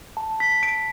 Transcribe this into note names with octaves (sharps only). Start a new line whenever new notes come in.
A5
B6
A5
D7